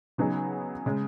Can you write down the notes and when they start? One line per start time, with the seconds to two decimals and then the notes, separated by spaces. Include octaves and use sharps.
0.18 C#3 F#3 B3 D#4 G#4
0.86 C#3 G#3